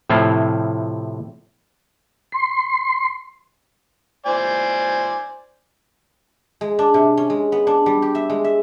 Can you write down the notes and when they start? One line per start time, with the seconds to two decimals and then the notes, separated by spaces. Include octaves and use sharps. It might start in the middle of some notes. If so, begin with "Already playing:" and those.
0.10 A2 C3 F3 E4 F4
2.32 C6
4.26 C5 D5 G#5
6.61 G#3
6.79 D4
6.94 C3
7.17 C#4
7.30 G#3
7.52 B3
7.67 D4
7.86 G3
8.02 G4
8.15 E5
8.30 G#3
8.44 E5